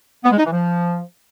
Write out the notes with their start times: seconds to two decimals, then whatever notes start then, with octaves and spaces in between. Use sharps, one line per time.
0.24 B3
0.31 G#3
0.38 D#4
0.45 E3
0.52 F3